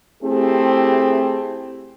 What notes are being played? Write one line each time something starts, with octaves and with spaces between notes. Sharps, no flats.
A3 C4 E4 G4 G#4